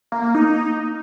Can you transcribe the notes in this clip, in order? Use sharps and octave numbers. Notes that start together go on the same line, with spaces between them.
A#3
A#3
D#4